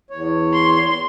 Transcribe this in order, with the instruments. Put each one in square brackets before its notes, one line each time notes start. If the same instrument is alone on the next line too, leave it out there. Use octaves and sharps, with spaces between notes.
[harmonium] E2 C#5
[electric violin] C6